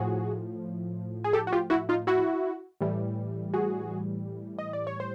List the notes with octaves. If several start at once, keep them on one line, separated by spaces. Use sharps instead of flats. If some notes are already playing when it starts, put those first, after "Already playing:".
Already playing: A2 F3 F#4 G#4
G#4
G4 A4
F#4
F4 G4
E4 F#4
D#4 F4
E4 F#4
A2 E3 G3
F#4 G#4
D#5
D5
C#5
C5